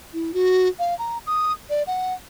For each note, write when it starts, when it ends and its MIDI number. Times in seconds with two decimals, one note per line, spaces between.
0.13 0.34 64
0.34 0.68 66
0.79 0.97 77
0.99 1.18 82
1.27 1.53 87
1.70 1.83 74
1.87 2.14 78